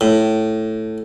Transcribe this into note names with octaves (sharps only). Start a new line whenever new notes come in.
A2